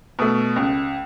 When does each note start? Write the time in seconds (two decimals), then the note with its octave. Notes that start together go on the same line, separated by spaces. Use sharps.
0.19 B2 A3
0.56 C#2